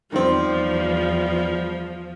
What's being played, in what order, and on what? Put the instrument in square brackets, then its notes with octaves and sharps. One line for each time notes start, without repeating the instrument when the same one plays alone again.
[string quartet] E2 F3 [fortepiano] D#3 C4 [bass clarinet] G3